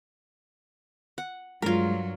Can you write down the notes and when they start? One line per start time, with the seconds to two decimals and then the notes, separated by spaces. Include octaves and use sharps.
1.18 F#5
1.62 G2 F#3 G#3 F4 A#4